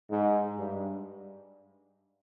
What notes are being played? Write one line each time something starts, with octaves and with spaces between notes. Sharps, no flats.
G#2
G2